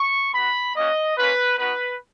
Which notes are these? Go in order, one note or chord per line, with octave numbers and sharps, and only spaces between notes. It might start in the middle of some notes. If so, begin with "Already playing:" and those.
Already playing: C#6
B3 F#4 B5
A#3 C#4 F#4 D#5
A#3 C#4 F4 B4
B3 D#4 F#4 B4